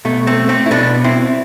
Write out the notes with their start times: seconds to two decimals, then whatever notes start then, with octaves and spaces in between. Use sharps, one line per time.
0.05 B2 A3
0.27 A3 C4
0.49 A3 C4
0.66 E4
0.71 B2 B3 D4
1.04 C4 E4